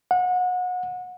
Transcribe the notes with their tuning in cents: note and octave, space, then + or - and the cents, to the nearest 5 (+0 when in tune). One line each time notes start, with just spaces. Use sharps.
F#5 -30